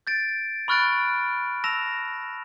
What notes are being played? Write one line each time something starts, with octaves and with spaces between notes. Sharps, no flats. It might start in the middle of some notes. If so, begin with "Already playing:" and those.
G6 A6 D7
B5 C#6 F6 F#6 A6 D7
A5 E6 A#6 E7 F7